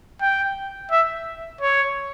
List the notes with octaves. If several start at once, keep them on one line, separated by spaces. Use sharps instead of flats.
G5
E5
C#5